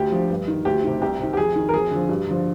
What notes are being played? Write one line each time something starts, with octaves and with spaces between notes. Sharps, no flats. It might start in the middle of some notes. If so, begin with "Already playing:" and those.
Already playing: D2 G4
D3 F3
G2
D#3
D2 G4
C3 D#3
C2 G4
C3 D#3
G4
F2 G#4
D#3
A#4
F2 G#4
D3 F3
G2
D3 F3